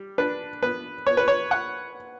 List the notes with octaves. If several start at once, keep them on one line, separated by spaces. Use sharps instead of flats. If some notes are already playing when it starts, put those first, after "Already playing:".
Already playing: G3
D4 B4
B3 B4
B3 C#5
B4
C#5
F#5